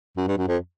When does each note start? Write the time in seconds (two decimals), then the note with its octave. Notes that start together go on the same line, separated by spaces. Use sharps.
0.17 F#2
0.27 G2
0.37 F#2
0.48 F2